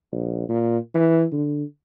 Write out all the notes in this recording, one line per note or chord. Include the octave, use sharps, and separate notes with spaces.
A#1
A#2
E3
D3